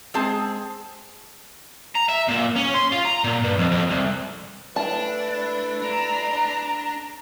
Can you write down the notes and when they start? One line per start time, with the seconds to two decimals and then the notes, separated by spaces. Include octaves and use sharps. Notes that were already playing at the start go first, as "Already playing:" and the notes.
0.14 G#3 C4 G#4 A5
1.95 A#5
2.09 E5
2.28 A#2
2.56 C#4
2.74 C6
2.92 F4
3.05 A#5
3.24 A#2
3.43 G2
3.59 F2
3.71 F2
3.90 C2
4.76 A3 D4 E4 B4 A5
5.82 D4 A#5